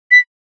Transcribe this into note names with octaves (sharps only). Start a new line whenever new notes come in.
B6